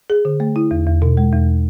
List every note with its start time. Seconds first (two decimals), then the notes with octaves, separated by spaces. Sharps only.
0.10 G#4
0.25 D3
0.40 A3
0.56 E4
0.71 E2
0.87 E2
1.02 B2
1.17 G#3
1.32 E2